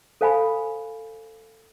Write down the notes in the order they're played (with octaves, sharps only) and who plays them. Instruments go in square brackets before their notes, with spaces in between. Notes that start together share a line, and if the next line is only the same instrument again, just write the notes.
[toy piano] A4 C5 F5 G#5 B5